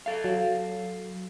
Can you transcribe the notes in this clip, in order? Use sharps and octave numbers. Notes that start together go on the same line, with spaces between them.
A4 F5
F#3